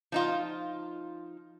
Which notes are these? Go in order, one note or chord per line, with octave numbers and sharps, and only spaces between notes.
F3 D#4 F4